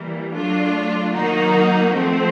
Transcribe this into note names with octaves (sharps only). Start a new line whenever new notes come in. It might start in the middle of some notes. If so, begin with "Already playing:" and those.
Already playing: E3 G3 A#3
F#3 A3 D4 F4
D#3 F#3 A#3 D#4 F#4
F3 A3 C4